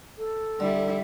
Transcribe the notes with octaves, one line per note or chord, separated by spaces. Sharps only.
A4
D3 G3 E4